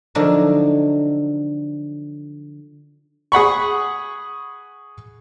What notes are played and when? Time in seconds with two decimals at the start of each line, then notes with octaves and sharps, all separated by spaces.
0.15 D3 F3 F#3 D4 D#4 F#4
3.32 G#4 F#5 B5 C#6